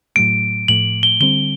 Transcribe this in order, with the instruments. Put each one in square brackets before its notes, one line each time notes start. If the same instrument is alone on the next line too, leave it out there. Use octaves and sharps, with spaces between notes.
[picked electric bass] A2 F#3 A3 [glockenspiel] D7
[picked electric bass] A2 F3 A3 [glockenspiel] F#7
[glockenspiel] G7
[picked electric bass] D3 G3 C4 [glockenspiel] G7